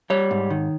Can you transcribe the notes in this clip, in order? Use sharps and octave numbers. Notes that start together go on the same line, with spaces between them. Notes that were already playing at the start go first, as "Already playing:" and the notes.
G3 C#5
G#2
D#3